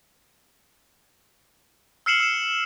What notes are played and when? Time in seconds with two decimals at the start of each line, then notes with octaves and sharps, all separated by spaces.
2.06 E6 F6 C7 C#7 E7 F#7
2.20 E6 E7